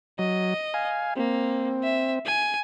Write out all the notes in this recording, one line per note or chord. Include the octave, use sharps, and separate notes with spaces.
F#3 D#5
F5 G#5
A#3 C4
E5
G#5